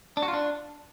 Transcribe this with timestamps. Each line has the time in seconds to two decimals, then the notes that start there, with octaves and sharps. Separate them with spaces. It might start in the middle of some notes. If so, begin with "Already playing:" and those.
0.17 D4
0.22 F#4
0.28 F4
0.33 D4